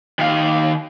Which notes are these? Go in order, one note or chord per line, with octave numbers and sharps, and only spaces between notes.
D#3 F5